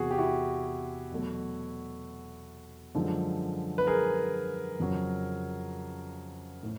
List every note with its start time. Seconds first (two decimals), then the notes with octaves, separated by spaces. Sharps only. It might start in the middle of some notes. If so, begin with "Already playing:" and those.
Already playing: E2 C3 E3 F#4 G#4
0.11 G4
0.18 E4 F#4
1.11 E2 B2 F#3 A3
2.95 F#2 D3 F3 G#3
3.78 B4
3.87 G#4 A#4
4.80 F2 C#3 F#3
6.63 A2